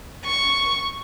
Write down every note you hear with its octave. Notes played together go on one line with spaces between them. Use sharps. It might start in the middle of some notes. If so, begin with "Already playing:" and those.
C#6